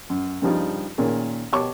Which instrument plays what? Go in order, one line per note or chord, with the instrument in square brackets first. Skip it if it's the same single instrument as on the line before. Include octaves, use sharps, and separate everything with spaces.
[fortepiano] F#2
G2 C#3 F3 G3 D#4
A#2 D#3 A#3 C#4 G#4
B2 G4 C#5 A5 C#6 D6